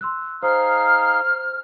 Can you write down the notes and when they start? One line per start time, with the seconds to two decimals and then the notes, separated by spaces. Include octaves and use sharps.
0.01 C6 E6 F#6
0.43 D#4 G#4 C5 F5 F6